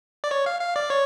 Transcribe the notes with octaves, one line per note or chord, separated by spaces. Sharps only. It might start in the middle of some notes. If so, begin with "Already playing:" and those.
D5
C#5
F5
F5
D5
C#5